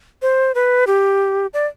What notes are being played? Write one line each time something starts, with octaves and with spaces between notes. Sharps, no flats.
C5
B4
G4
D5